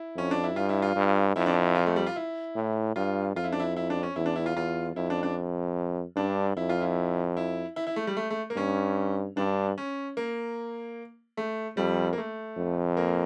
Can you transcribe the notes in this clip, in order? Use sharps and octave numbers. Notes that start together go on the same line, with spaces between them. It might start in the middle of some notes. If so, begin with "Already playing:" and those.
Already playing: E4
F2 C#4
D4
E4
G2 F4
E4
F4
G2
F2 E4
D4
E4
E4
F4
A3
G3
F4
E4
A2
G2 F4
F2 F4
E4
D4
E4
E4
D4
C#4
E2 E4
D4
E4
F4
E2 F4
F2 E4
D4
D4
G2 D4
F2 E4
F4
E4
E4
E4
E4
A3
G3
A3
A3
A#3
G2 C#4
G2 D4
C#4
A#3
A3
F2 G3
A#3
A3
F2
A#3